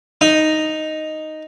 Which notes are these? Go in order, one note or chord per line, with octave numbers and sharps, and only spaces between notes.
D#4